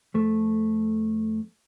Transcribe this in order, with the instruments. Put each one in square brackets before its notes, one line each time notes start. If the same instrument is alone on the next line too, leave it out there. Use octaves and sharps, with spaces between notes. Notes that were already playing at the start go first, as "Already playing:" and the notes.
[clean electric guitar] F2 A3